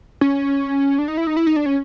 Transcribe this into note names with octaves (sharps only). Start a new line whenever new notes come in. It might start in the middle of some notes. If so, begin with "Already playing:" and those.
C#4
D4
D#4
E4
D#4
E4
D#4
D4
C#4